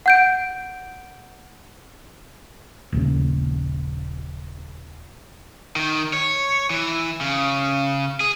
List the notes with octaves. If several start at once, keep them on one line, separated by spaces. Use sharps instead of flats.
F#5 G6 D7
D#1 A#1 C#3
D#3
C#5
E3
C#3
G#4